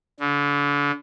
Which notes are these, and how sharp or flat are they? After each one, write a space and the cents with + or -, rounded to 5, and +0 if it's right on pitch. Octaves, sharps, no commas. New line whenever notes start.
D3 -35